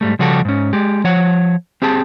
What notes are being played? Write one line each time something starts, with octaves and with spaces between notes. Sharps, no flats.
G#2 G3 A3
C#3 F3 G3 F#4 G4 A4
G#2 C#4
G#3 G4
F3 C#5 F#5
C4 G4 G#4 A5